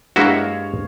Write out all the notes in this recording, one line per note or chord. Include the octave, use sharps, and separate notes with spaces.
G2 G#3 A#3 E4 F#4 C#5 F5